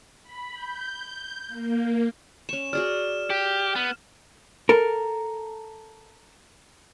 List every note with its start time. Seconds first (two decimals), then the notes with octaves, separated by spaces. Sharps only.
0.23 B5
0.54 G6
1.48 A#3
2.49 C#4 C#6 E7
2.73 F#4 G#4 D5 F6
3.30 G4
3.76 B3
4.69 A4 A#4